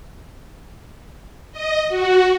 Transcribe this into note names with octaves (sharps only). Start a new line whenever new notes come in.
D#5
F#4